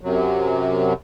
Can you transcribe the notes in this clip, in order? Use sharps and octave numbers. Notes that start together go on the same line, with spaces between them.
F#2 C3 F#3